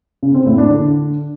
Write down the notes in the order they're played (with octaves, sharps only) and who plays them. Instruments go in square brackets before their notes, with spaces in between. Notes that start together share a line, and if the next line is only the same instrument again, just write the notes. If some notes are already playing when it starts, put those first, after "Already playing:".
[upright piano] C#3
C4
A2
D4
D3